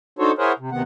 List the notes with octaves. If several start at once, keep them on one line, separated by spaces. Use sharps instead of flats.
D4 D#4 F#4 A4 C5 C#5
E4 G#4 A#4 C5 C#5 F#5
C3
D2 C3 D#3 B3 F#5